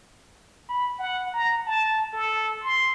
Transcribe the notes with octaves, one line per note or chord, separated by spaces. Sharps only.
B5
F#5
A#5
A5
A4
C6